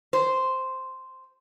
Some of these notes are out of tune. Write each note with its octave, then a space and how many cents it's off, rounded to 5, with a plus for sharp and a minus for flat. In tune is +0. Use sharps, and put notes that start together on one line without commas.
C5 -5